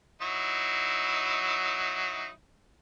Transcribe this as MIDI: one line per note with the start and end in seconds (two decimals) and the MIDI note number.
0.21 2.30 54
0.21 2.30 63
0.21 2.30 64